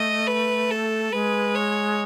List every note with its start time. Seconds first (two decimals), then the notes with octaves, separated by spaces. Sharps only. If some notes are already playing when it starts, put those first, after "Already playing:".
Already playing: A3 D#5
0.27 B4
0.71 A4
1.12 G#3 B4
1.55 C#5